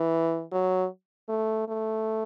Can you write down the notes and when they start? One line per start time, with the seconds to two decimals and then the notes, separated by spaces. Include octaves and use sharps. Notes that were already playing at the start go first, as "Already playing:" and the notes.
Already playing: E3
0.52 F#3
1.29 A3
1.68 A3